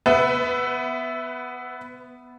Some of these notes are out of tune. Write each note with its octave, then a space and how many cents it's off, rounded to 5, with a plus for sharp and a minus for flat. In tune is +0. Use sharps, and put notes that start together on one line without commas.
B3 +5 B4 +35 E5 +0